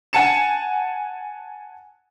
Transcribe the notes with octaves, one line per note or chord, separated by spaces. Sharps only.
F#5 G#5 A5 C#7 E7